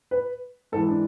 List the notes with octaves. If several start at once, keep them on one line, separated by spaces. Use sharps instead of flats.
B4
G#2 E3 A4
D4